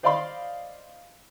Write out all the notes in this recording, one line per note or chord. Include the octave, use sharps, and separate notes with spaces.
C5 D5 D#5 F5 B5 C6